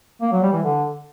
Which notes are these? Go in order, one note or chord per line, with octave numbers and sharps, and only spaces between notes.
A#3
F#3
G3
E3
D3